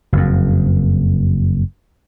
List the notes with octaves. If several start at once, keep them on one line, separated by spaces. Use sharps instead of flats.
F#1 F2